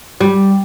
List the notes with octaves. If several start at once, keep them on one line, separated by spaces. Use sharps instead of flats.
G3